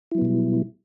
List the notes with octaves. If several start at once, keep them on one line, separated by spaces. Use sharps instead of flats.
B2 F#3 G3 B3 E4